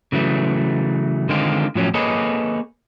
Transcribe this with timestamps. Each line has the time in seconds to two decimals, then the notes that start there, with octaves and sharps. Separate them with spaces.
0.12 C#3 E3 F#3 A3
1.29 D3 D#3 G#3 C4 F4
1.75 A2 F3 F#3 C#4
1.94 A#3 G#4 A4 B4 C#5 D#5